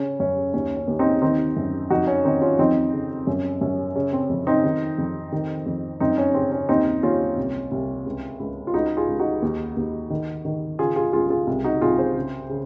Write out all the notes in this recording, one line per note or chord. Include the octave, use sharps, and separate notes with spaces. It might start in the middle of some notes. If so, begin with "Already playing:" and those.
Already playing: C#3 C#4
F#2 C#4
D#2 C#4
C#4
D#2
C4 D#4
D#3 C4 D#4
F#2
F2 D#4 F#4
C#4
D#3 C4 D#4
C#4 F4
F2 C4 D#4
C#3
F#2 C#4
F#2 C#4
C#3 C#4
C4
F2
C4 D#4
D#3
F2
D#3
F2
F#2 C4 D#4
C#4
C#3 C4
C#4
D#2 C4 D#4
D#2 C#4 F4
C2
C2
C#2
C#2
F4
C#2 D#4 F#4
F4 G#4
C#2
D#4 F#4
D#2
D#2
D#3
D#3
C#3 F4 G#4
F4 G#4
C#2 F4 G#4
F4 G#4
C2
D#4 F#4
C2 F4 G#4
G#4 C5
C#3
C#3